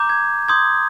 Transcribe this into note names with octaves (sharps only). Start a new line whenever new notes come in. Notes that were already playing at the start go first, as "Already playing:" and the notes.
Already playing: A#5 D6 G6
G#6
C6 D#6 G6 G#6